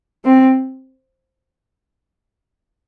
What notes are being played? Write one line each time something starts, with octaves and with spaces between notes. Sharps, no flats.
C4